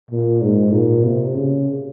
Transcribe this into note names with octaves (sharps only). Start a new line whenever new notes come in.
A#2
G#2
A#2
C3
C#3